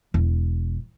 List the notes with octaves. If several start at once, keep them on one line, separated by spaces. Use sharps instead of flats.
E1